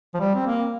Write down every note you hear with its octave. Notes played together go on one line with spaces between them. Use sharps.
F3
G3
C4
A#3